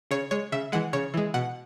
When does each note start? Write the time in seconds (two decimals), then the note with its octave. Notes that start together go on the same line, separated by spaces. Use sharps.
0.11 C#3 C#5
0.31 G#3 C#5
0.52 C#3 E5
0.72 E3 G#3 F#5
0.93 C#3 C#5
1.14 E3 G#3
1.34 B2 F#5